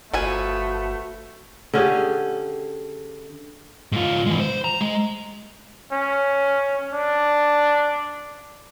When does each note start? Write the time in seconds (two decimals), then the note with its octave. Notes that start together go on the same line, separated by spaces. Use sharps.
0.13 G1 F3 A3 B3 F#4 G#5
1.74 D3 C#4 G4 G#4
3.92 G#2 F4
4.26 E3 G#3
4.39 C5
4.64 A#5
4.81 G#3
5.92 C#4
6.93 D4